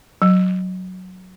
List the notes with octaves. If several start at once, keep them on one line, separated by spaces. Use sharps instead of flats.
F#3